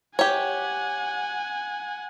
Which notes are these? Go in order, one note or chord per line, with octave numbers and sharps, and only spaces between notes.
G4 C#5 F#5 G#5